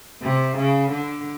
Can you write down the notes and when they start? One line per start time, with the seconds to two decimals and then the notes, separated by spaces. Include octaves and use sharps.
0.22 C3
0.57 C#3
0.91 D3